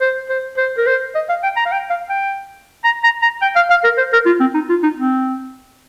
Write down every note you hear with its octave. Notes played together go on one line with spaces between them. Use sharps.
C5
C5
C5
A#4
C5
D#5
F5
G5
A#5
F5
G5
F5
G5
A#5
A#5
A#5
G5
F5
F5
A#4
C5
A#4
F4
C4
D#4
F4
D#4
C4